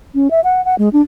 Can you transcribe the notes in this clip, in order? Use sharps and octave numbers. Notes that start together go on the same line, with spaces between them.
C#4
E5
F#5
F#5
G#3
D4